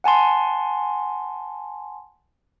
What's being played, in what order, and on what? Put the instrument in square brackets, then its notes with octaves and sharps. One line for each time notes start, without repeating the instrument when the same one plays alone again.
[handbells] F#5 G#5 A5 C6